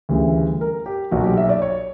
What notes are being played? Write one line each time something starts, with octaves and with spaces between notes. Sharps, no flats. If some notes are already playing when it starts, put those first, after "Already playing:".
D2 C#3 E3 G3
A#4
G4
B1 A#2 F#3 F#4
G4
E5
D5
C#5